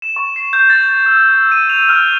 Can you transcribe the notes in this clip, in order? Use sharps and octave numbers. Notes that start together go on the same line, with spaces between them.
E7
C#6
C7
G6
A6
A6
E6
D#7
F7
F6